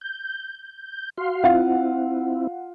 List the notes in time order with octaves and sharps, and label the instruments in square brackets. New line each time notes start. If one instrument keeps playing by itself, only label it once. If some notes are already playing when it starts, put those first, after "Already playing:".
[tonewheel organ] G6
F#4 F5 C6
[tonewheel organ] C4 E4 [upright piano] F4 F5 F#5